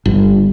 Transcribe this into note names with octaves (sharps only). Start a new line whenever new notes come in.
G1